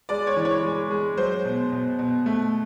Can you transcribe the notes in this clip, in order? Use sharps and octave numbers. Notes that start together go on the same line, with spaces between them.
G#3 D5
C#5
E3
C#5
G#3
G#3
F#3 C5
B2
B2
B2
A3